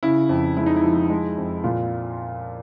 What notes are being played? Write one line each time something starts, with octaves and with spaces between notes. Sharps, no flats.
C#3 E4
F2
G#3 E4
D#4
E4
F3
G#3
F2
A#2 F4